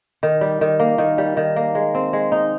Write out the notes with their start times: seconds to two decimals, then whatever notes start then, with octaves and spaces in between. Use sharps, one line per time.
0.23 D#3
0.41 G3
0.61 D#3
0.80 A#3
0.98 D#3
1.18 G3
1.37 D#3
1.56 A#3
1.75 G#3
1.95 C4
2.13 G#3
2.32 D#4